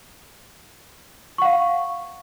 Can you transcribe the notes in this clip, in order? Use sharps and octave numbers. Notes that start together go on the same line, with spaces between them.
F5 F#5 C#6